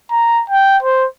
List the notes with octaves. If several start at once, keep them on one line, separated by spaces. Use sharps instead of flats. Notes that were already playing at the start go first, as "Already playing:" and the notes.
A#5
G5
C5